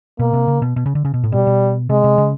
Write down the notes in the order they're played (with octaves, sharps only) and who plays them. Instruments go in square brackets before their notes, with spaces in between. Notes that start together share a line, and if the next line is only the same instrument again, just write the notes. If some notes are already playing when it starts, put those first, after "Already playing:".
[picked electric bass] B2 [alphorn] A#3
[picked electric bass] C3
C#3
B2
B2
C#3
D3
C#3
B2
A2
[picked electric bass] B2 [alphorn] G3
[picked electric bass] B2
[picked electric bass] C3 [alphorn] G#3
[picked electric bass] C3
C#3